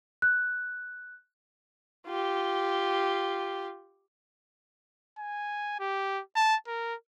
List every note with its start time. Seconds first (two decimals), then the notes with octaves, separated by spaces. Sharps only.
0.22 F#6
2.06 F4 G4
5.19 G#5
5.80 G4
6.36 A5
6.67 A#4